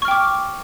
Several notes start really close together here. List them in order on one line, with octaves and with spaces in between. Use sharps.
C#6 F6 G5 D6